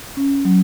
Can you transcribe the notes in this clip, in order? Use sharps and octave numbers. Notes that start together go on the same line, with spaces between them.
C#4
F#3